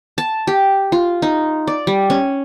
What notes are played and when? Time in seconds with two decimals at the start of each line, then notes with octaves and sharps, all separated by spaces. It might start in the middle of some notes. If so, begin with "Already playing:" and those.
0.18 A5
0.47 G4
0.92 F4
1.22 D#4
1.67 D5
1.87 G3
2.10 C#4